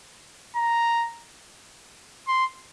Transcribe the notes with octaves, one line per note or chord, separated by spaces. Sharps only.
A#5
C6